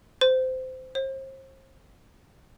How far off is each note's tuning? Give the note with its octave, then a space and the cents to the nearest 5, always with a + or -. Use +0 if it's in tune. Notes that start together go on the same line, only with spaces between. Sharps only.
C5 -20
C5 +35